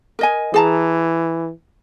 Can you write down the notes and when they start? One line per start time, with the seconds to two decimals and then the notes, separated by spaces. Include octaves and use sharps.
0.19 A#4 D#5 G#5
0.54 E3 G#4 A5 A#5